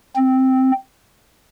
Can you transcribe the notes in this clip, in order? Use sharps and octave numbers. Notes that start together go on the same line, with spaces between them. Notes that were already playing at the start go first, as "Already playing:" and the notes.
C4